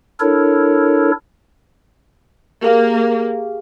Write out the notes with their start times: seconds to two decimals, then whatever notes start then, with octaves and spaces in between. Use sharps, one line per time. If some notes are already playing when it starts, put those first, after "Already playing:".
0.20 D4 E4 A4 A#4 C#5
2.63 A#3 G4 G#4 F5